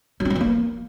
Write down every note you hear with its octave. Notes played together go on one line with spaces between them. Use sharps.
F#3
C4
F#3
E3
A#3